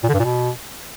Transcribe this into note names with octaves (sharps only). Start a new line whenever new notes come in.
A#2
D3
G2
A#2
B2